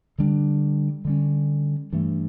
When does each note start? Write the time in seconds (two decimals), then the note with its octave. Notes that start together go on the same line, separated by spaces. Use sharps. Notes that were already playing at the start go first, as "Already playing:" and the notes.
0.18 D3 G3 D4
1.05 D3 G3 C#4
1.93 G2 E3 A3